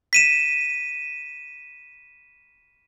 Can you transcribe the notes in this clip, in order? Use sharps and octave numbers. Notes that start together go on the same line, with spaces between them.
B6 D#7 E7